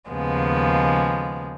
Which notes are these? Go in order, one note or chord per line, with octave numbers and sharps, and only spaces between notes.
D#2 C#3 F3 G#3 B3